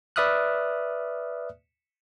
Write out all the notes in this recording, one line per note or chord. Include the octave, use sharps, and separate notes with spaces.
B4 D5 E5 D#6 F6 F#6